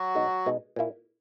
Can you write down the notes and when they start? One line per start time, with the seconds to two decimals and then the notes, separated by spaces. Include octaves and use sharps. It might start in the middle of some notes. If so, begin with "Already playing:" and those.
Already playing: F#3 F#4
0.15 B2 G#3 D#4
0.46 B2 G#3 D#4
0.76 A#2 A#3 E4